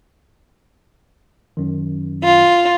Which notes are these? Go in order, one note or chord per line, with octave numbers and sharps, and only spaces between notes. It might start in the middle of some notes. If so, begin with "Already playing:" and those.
F#2 D#3
F4